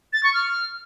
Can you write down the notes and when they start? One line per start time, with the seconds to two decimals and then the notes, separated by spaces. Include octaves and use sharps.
0.13 A6
0.23 C#6
0.34 F6